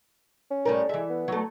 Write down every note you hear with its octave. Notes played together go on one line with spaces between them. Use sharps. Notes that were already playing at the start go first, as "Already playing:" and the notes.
C#4
A2 G3 A#4
E3 G#3 E5
B3
F#3 A3